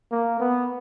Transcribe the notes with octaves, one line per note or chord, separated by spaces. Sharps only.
A#3
B3